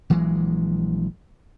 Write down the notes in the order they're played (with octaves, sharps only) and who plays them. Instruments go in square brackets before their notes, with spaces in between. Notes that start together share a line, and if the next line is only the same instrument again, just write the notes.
[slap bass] A#1 E3 F#3 G#3